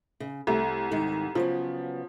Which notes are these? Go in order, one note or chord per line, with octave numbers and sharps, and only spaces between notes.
C#3
C2 A3
G#2 D#3
C#3 F3 F#3 B3